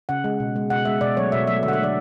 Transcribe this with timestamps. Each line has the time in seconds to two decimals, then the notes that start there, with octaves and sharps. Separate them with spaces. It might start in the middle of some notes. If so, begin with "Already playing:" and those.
0.09 C#3 F#5
0.24 G#3
0.40 B2
0.56 G#3
0.70 B2 F#5
0.85 G#3 E5
1.01 B2 D5
1.17 F#3 A3 C#5
1.32 B2 E5
1.47 F#3 A3 E5
1.63 D3 E5
1.68 F#5
1.73 E5
1.79 F#3 A3 D5